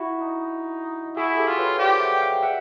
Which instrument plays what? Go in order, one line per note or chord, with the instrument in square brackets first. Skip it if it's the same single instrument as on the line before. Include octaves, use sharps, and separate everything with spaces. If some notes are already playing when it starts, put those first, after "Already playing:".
Already playing: [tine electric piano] E4 F#4
[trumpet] D#4
[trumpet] E4 [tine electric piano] F#4 G#4
[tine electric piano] G4 A4
[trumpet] F4
[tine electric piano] B4 C#5
[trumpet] G4 [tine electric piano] C5 D5
[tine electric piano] E5 F#5
F5 G5
E5 F#5